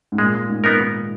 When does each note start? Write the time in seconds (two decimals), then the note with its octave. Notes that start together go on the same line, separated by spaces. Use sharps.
0.12 G#2
0.18 A#2 G#3
0.49 G#2
0.64 B3 D#4 A#4
0.79 D#3